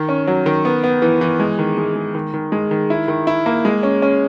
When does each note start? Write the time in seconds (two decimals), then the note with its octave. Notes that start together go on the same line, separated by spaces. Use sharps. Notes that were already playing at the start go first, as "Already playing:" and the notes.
Already playing: D#3
0.09 C#4
0.27 F#3
0.46 D#3
0.65 B3
0.84 B3
1.02 E3
1.21 E3
1.40 G#3
1.59 D#3
1.77 G#3
1.95 G#3
2.15 D#3
2.34 D#3
2.52 G#3
2.71 D#3
2.90 E4
3.08 D#3
3.27 E4
3.46 A#3
3.65 G#3
3.83 C#4
4.02 C#4